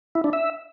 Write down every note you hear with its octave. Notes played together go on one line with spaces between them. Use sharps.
E4
D4
E5